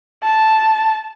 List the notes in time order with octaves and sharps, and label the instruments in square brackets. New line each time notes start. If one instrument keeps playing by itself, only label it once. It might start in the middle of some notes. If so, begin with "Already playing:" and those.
[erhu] A5